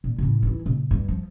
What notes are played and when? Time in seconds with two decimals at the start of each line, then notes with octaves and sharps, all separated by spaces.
0.04 A#2
0.18 A2 C#3
0.43 E3 E4
0.66 A#2 C#3
0.91 G2
1.08 F3